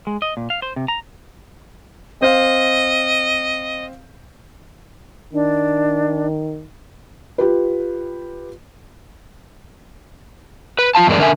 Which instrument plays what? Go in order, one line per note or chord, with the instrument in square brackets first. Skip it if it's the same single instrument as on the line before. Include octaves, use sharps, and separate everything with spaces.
[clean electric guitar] G#3
D#5
A#2
F5
C5
C3
A#5
[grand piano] C4 C5 F5 [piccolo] D#5
[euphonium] D#3 [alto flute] D4
[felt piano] F4 G4 B4
[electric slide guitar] B4
F4 F5 A5
E2 G2 G#3 A#4 D5
D3 A#4 E5 G#5